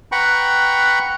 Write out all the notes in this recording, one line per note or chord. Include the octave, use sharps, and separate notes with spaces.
B4 F#5 G5 A#5 B5 C#6